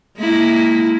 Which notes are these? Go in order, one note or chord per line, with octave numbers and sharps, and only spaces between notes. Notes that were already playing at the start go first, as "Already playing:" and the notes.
G#3 A#3 E4